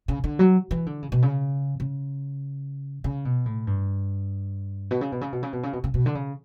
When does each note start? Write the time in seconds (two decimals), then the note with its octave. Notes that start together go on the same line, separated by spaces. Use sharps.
0.08 C#3
0.24 D3
0.39 F#3
0.71 E3
0.86 D3
1.02 C#3
1.12 B2
1.22 C#3
1.80 C#3
3.04 C#3
3.25 B2
3.46 A2
3.67 G2
4.91 B2
5.01 C#3
5.12 B2
5.21 C#3
5.32 B2
5.43 C#3
5.53 B2
5.63 C#3
5.73 B2
5.84 C#3
5.94 B2
6.06 D3
6.15 C#3